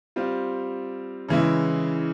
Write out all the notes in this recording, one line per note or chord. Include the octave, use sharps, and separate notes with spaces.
G3 C4 F4
C#3 E3 G#3 E4